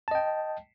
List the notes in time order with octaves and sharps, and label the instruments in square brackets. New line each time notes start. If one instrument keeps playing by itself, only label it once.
[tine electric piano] A5
D#5
G5